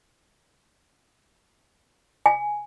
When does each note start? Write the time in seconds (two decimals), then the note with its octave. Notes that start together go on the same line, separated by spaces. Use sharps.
2.26 G#5